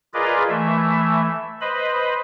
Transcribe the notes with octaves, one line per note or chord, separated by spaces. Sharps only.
F4 G#4 A#4 B4 D5 D#5
E3 A3 E5
B4 C5 D#5 B5